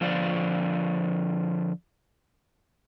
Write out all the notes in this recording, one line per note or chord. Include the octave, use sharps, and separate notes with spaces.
D3 F3 F4 C5 D5